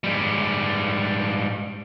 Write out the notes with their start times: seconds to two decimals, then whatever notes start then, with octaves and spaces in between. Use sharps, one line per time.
0.04 G#2 G3